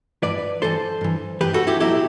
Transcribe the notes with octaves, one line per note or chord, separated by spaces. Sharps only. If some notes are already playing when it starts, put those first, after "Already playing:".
G2 E3 B4 D5
G2 E3 A4 C5
G2 E3
G2 E3 G4 B4
F#4 A4
E4 G4
B1 B2 F#3 E4 G4